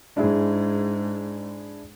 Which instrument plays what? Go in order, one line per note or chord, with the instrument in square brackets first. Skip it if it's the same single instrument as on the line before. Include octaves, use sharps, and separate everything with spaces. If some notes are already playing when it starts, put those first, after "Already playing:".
[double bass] G#2 [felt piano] D4 E4 G#4